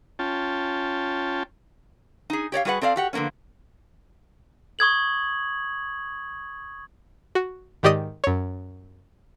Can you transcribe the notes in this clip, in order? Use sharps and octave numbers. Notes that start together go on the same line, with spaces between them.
C#4 F4 G5 A5
D#4 G#4
G4 C#5 D5 F5
G3 F#4 G#4 B4 F#5
C4 A4 D5 E5 F5
F#4 G4 F#5
D3 F3 A#3 B3 C#4
C#6 D#6 G#6 F#7
F#4
G#2 D#3 G4 D5 D#5 D#6
F#2 C#5